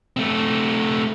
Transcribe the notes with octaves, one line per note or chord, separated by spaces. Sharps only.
A3 C4